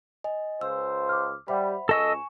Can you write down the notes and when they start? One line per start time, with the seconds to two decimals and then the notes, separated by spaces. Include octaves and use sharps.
0.24 D#5 G#5
0.61 C#2 F4 C5 E6
1.09 D6 F6
1.48 G3 C5 E5 F#5 B5
1.89 C#2 A4 D#5 G#5 C#6 E6 E7